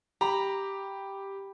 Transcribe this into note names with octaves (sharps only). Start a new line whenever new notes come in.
G4 A#5 B5